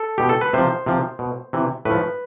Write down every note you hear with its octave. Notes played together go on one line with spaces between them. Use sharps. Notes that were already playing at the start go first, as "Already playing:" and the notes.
Already playing: A4
B2 G4
A4
B4
C3 F3 C5
C3 F3
B2
C3 E3
A2 B4
F3